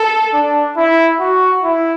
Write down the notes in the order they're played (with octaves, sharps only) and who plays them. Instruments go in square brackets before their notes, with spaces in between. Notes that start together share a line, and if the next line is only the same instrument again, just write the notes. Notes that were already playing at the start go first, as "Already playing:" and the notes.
Already playing: [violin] A4
[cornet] D4
E4
F#4
E4